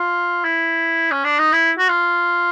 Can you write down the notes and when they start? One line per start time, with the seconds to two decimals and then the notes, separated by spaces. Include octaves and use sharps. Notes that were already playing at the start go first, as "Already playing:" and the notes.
Already playing: F4
0.45 E4
1.11 C#4
1.24 D4
1.39 D#4
1.53 E4
1.78 F#4
1.89 F4